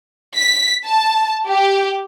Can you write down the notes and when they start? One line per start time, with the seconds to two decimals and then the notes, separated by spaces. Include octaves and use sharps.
0.36 B6
0.86 A5
1.48 G4